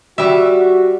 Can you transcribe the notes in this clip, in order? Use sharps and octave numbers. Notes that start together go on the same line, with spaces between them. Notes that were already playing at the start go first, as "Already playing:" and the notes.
G3 F#4 E5